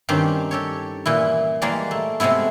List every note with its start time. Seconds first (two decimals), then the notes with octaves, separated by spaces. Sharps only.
0.09 G2 D#3 C4 C#4 G4
0.51 G4 A4 C#5
1.06 A#2 E3 E4
1.62 E3 G3 G#3 A#3 G#4 D5
1.91 A3
2.20 C3 G#3 A3 B3 E4